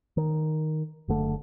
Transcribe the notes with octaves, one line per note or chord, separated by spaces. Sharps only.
D#3
F#1 D3 A3